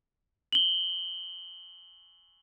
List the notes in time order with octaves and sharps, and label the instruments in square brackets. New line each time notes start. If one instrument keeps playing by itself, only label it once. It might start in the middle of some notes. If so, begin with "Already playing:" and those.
[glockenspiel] F#7 G7